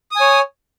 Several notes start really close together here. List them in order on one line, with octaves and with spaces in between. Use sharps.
D#6 G#5 C#5